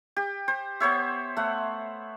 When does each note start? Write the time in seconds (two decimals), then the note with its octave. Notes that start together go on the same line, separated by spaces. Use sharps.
0.16 G4
0.48 C5
0.80 B3 C5 C#5 E5
1.37 A3 F#5